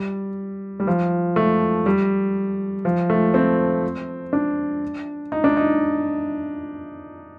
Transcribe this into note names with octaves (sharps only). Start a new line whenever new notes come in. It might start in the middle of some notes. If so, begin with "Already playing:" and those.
Already playing: G3
G3
F3
A3
G3
F3
A3
C4
D4
D#4
D4
D#4